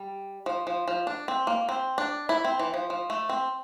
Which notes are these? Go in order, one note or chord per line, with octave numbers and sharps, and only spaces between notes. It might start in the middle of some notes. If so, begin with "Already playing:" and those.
Already playing: G3
F3
F3
F3
D4
C4
A#3
C4
D4
E4
C4
E3
F3
F3
A3
C4